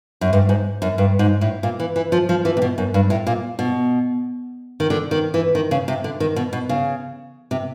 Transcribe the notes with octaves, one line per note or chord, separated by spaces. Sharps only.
F#2
G2
G#2
F#2
G2
G#2
A2
A#2
E3
E3
F3
F3
E3
C3
B2
F#2
G2
A2
A#2
B2
D#3
D3
D#3
E3
D#3
C#3
C3
D3
D#3
B2
B2
C#3
C3